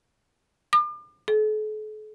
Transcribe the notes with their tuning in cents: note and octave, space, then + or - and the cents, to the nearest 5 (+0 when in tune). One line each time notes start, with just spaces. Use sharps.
D6 +40
A4 -45